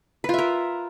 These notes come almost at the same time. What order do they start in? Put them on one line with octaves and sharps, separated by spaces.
B4 F4 E5 A#4